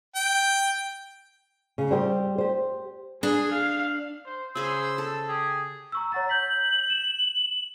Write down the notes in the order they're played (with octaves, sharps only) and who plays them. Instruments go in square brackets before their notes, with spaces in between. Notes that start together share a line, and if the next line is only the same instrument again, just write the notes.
[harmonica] G5
[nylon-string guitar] C#3
G3 C4 G4
G4 C5
[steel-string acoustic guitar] D4 [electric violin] G#4
[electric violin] F5
[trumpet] C5
[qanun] C#3 G#4 B5 [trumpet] C5 [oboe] E6
[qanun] A4
[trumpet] G4 [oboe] G#4
[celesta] A#5 C#6 E6
[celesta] C#5 F#5 A#5 [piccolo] A6
[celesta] G6 B6 [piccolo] F#7
[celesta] E7